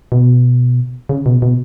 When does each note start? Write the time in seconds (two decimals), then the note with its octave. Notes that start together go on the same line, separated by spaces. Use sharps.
0.12 B2
1.09 C#3
1.26 B2
1.42 B2